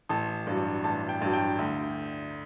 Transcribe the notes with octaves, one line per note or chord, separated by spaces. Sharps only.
A1 A5
G2 F#3
A1 A5
G5
G2 F#3
G5
D2